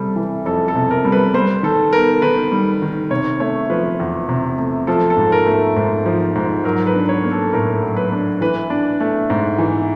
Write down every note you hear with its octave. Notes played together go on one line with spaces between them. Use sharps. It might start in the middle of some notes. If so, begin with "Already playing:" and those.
Already playing: C3 G3 A4
E3
F2 A4
A4
C3
A#4
G3
B4
G3 C5
D#3 A4
B3 A#4
D#3 B4
G3
D#3
C3 C#5
A3 C#5
F3 B4
E2
C3
A3
F3 A4
A4
G#2
A#4
A3
G#2
F3
G#2
F#3 A#4
B4
D4
C#5
A#3
A4
A2 A#4
F#3
B4
D4
E3 B4
D4
A3
G#2
E3